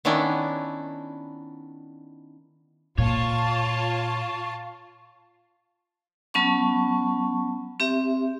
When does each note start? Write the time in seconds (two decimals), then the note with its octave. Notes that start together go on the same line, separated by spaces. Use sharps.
0.05 D#3 B3 C#4 D4 E4
2.98 A#2 F4 C#5 A5
6.34 F#3 B3 C#4 A5 C#6
7.80 C4 G4 E5